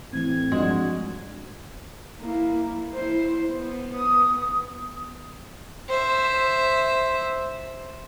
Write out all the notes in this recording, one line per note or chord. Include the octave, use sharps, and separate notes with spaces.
A2 E3 A3 C4 G#6
G2 F3 G#3 D4 F#4
A#3 E4
E4 C5
B3
D#6
C5 E5